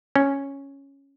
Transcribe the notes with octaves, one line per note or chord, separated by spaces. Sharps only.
C#4